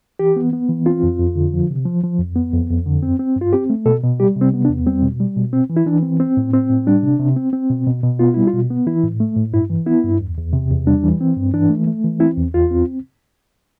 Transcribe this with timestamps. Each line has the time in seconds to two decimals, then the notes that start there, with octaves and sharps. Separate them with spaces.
0.19 E3 G4
0.36 B3
0.53 B3
0.69 E3
0.86 C4 F4
1.03 F2
1.19 F2
1.36 D3
1.53 F3
1.70 C3
1.86 F3
2.03 F3
2.19 F2
2.36 B3
2.53 F2
2.70 F2
2.86 D3
3.03 C4
3.19 C4
3.36 G2
3.41 F4
3.53 C4 G4
3.70 A3
3.86 B2 A4
4.03 B2
4.20 G3 G4
4.36 C3
4.41 C4
4.54 B3
4.65 D4
4.70 E2
4.86 G3 C4
5.03 B2
5.20 G3
5.37 B2
5.53 C4
5.70 E3
5.77 E4
5.86 E3 D4
6.03 C4
6.20 C4
6.37 A2
6.53 C4
6.70 A2
6.87 G3 D4
7.03 C3
7.20 C3
7.36 C4
7.53 C4
7.70 B2
7.87 B2
8.03 B2
8.19 B3 F4
8.34 G3 E4
8.47 F4
8.54 B2
8.70 B3
8.87 E3 E4
9.04 A2
9.20 A3
9.36 A2
9.53 G2 E4
9.70 E3
9.86 B3 E4
10.04 G2
10.21 E2
10.37 E2
10.53 C3
10.71 E2
10.87 G3 D4
11.03 E3
11.21 C4
11.36 G2
11.54 E3 D4
11.70 A3
11.87 A3
12.04 E3
12.20 C4 E4
12.37 E2
12.54 E2 F4
12.71 C4